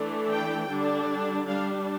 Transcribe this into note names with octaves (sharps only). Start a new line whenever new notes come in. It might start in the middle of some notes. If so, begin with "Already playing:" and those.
Already playing: E3 A3 D4
G5
D3 G3 D4
G3 D4 F5